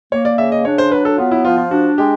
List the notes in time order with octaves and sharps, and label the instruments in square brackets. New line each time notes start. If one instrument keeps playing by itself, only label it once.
[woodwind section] A#3 [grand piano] C#5
[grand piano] D5
[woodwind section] C#3 [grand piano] E5
[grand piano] D#5
[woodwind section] D4 [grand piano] C#5
[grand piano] C5
[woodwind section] F#3 [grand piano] B4
[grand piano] A4
[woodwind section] B3 [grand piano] F4
[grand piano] E4
[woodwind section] F3 [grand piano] F4
[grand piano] F4
[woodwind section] D4 [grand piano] F#4
[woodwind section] G#3 [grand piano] G4